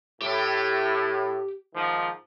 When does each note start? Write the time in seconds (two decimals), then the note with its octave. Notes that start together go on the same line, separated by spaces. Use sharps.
0.22 A2 G4 G5
1.75 G#2 D#3 F3